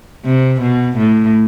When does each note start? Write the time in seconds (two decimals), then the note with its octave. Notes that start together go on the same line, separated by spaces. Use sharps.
0.25 C3
0.61 B2
0.97 A2